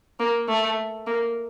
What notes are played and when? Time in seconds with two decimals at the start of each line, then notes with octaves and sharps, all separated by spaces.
0.20 A#3
0.48 A3
1.07 A#3